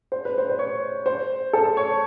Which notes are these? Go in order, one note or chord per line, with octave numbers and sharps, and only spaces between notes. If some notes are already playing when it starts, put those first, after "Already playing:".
C5
B4
C5
C5
C#5
C5
A4
C#5